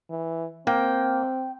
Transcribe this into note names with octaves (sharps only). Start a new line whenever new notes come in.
E3
A#3 C4 G5